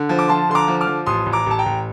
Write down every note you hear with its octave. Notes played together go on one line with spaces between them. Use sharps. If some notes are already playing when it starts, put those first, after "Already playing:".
Already playing: D3
F3
D6
F3 A5 C6
D3 C6
A#5 D6
F3
D6 F6
F3
A1 C6 D#6
A1
A#5 D6
A1 A5
G5 A#5
A1